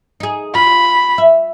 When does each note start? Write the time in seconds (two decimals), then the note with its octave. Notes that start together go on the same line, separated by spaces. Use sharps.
0.20 D#4 G#4
0.55 F4 B5
1.18 E5